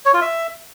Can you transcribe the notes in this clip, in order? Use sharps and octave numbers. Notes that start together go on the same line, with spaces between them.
C#5
F4
E5